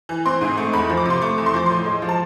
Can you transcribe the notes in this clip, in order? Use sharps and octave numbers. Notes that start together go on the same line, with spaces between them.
E3
C4 C6
G#2
A3
E2 B5
F3
D6
C3 C6
A3 D6
E2
C6
F3 D6
A2 C6
G#3
F3
A5